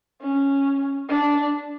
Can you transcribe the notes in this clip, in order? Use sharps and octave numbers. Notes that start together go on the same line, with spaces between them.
C#4
D4